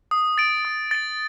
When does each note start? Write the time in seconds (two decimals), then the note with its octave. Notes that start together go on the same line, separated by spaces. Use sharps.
0.11 D#6
0.38 A6 D7
0.65 D#6
0.91 A6 D7